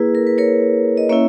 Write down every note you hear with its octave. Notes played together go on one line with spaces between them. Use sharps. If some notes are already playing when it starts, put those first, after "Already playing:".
Already playing: A#3 E4 G#4 B4
A#4
B4
A#4 C#5
D#5
A#3 C#4 E4 C#5 E5